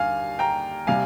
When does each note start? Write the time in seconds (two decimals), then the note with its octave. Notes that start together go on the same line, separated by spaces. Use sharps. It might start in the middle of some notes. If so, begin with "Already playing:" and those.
Already playing: D#2 D3 G3 F5 G#5
0.39 G5 A#5
0.87 C3 G3 F5 G#5